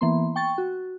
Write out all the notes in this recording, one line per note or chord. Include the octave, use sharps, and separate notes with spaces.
E3 A#3 B3 C6
G5 C#6 A6
F#4